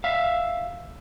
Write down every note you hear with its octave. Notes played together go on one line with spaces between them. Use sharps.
E5 F5